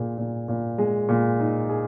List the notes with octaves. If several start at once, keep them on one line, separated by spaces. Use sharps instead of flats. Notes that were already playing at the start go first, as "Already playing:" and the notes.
Already playing: A#2 G#4
A#2
A#2
G#3
A#2
D#4
G#4